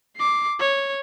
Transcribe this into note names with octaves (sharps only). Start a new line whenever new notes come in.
D6 C7
C#5